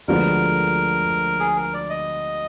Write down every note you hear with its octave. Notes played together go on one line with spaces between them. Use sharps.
D2 D3 F3 G#3 B3 A#4
G#4
A#4
D5
D#5